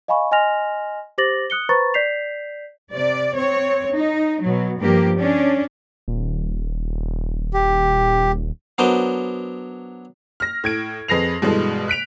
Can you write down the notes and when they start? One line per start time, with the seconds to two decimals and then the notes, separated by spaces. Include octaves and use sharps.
0.08 D#5 F5 G#5 B5 C#6
0.32 D#5 G#5 C6 F6 A#6 F7
1.18 G4 C5 D6 A6 A#6 F#7
1.50 D#6 F#6 C#7 G7
1.69 B4 C5 A#5 B5 C#6 A6
1.94 D5 G6 B6 C7 F7
2.92 C3 D5
3.36 C4 C#5
3.94 D#4
4.43 B2 F#3
4.82 G2 F3 A#3 G4
5.19 C#4 D4
6.08 D#1
7.54 G4
8.78 F#3 B3 D4 A#4 C5 D#5
10.40 F6 A#6
10.64 A2 G#6 D7
11.08 F2 G#4 B4 A#6 C7 F7
11.42 G2 B2 E3 G#3 A4
11.88 F#6 B6 D7 F7